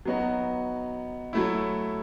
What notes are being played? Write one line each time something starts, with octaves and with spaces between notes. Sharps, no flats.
F#3 B3 D#4 F#4
F#3 A3 E4